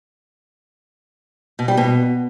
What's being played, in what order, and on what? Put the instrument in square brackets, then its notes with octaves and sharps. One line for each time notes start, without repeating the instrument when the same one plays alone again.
[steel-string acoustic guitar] B2
G3
B2